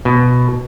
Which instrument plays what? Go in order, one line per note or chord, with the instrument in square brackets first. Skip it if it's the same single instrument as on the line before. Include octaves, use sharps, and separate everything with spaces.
[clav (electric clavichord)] B2